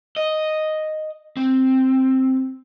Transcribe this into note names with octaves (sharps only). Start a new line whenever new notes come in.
D#5
C4